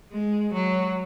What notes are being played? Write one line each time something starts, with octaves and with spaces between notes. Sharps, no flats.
G#3
F#3